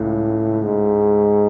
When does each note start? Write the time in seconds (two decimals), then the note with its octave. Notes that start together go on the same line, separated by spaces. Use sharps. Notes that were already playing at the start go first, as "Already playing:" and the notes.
Already playing: C#2 A2
0.64 G#2